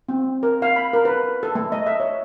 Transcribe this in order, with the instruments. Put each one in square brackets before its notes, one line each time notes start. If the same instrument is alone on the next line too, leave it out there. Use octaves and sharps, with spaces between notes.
[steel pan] C4
A#4
F5
B5
A#4
B4
A4
A3
D#5
E5
C#5